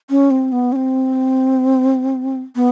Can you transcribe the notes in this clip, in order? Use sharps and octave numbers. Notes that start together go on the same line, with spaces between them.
C#4
C4
B3
C#4
C4
B3